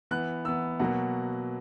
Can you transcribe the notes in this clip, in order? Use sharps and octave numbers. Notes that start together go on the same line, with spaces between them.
E3 B3 F#6
E3 B3 E6
B2 F#3 A#3 F#5